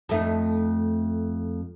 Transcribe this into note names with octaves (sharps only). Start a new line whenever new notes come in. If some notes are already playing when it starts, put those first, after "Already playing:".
F2 A3 D#4